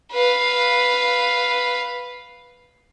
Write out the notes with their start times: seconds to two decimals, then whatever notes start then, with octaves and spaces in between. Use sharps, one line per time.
0.12 B4 F5